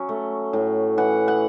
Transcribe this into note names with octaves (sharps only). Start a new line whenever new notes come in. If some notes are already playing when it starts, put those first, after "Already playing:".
Already playing: F#3 C#4
A3
A2
E3 F#5
F#5